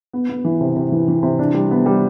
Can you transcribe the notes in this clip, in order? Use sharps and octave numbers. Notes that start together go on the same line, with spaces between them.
B3
B3
E3
C3
C3
E3
E3
C3
D4
G3
B3
G3